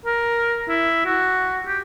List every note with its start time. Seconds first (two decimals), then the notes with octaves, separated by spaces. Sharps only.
0.06 A#4
0.68 E4
1.05 F#4
1.67 G4